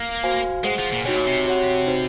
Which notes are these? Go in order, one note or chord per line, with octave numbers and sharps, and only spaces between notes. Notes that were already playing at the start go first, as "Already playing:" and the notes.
Already playing: A#3
F#4 C5 F5 G#5
G#3 G#4 C5 F#5
F3
A#2
C3 D#4 F#4 C#5 G#5
A#2
C3
F#4 C#5 F#5
D#4 F#4 C5